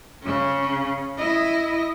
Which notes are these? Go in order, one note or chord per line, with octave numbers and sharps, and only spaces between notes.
C#3 C#4
E4 D#5